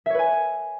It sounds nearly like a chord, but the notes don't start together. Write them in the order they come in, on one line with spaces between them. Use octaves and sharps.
E5 C#5 B4 G#5